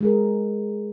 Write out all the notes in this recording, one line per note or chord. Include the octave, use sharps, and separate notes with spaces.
G#3 G#4 A#4